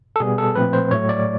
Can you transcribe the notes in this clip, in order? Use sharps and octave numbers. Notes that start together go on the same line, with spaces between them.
A4
B2 G3 B3 G#4
A4
A#2 F3 A3 C4 B4
C5
A2 F#3 A3 C#5
D5